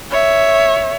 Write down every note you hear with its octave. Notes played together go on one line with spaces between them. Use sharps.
C#5 E5